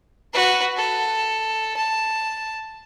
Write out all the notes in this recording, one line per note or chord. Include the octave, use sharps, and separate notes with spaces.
F#4 B4
A4
A5